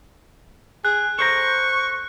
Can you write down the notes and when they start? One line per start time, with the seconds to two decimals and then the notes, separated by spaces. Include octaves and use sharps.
0.85 G#4 F#6
1.19 A4 C5 A#5 C#6